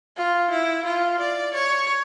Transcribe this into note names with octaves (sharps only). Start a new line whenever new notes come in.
F4
E4
F4
D5
C#5